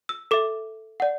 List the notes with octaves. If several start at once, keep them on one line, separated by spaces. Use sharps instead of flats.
E6
A4 E5 D6
D5 F#5